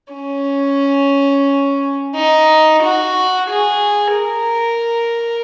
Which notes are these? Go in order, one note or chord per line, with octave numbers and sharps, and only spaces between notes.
C#4
D#4
F#4
G#4
A#4